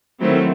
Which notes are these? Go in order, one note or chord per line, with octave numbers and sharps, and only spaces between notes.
D#3 F#3 A3 C4 E4